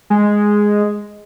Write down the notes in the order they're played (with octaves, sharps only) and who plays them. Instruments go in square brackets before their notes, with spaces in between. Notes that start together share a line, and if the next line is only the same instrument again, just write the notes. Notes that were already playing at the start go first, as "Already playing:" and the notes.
[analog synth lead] G#3